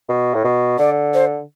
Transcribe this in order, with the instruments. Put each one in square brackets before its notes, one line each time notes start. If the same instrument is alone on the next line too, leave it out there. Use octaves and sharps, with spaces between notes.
[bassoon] B2
A2
B2
[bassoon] D3 [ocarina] D5
[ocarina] C5